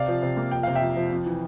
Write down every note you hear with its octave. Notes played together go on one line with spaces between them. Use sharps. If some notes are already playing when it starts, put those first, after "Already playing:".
Already playing: C3 D5 F5
F3
C3
A#3
F2 G5
C3 F5
E5 G5
F2
F3
F2
E3